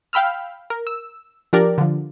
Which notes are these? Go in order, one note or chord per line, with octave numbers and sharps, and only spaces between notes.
F5 G5 B5 E6 F6
A#4
E6
F3 D4 G4 A#4 D5
D3 F3